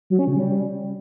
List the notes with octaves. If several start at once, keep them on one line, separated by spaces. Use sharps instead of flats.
F#3
C#4
C#3
G3